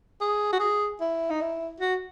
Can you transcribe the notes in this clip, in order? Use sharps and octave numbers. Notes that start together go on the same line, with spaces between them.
G#4
F#4
G#4
E4
D#4
E4
F#4